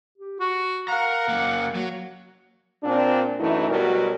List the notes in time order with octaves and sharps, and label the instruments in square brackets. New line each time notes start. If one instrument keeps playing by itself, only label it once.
[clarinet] G4
[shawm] F#4 [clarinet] C#6
[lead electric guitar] A#4 A#5 [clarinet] F5 [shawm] F#5
[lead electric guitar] F#2 A#3
F#3
[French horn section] A#2 C4 D4
F#2 E3 A3 D#4 E4
B2 F#3 G3 B3 A#4